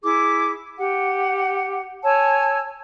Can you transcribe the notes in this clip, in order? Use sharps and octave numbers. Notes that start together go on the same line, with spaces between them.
E4 G#4 D6
G4 F#5
C#5 G#5 A5 E6